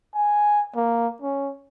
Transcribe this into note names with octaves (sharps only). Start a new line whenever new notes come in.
G#5
A#3
C#4